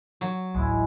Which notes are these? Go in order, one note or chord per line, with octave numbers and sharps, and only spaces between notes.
F#3
A1 D2 G#3 E4